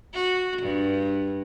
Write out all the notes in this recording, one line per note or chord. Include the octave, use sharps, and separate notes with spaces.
F#4
G2